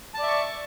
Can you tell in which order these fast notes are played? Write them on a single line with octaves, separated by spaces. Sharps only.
A5 D5 E5 C#6